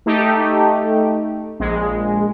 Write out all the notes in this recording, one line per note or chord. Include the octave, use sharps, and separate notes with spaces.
A3 D#4 G4
A#1 G#3